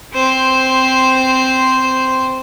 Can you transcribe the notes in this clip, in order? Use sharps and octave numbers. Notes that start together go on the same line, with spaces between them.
C4 C5